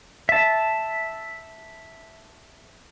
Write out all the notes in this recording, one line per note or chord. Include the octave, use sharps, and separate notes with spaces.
E5 A5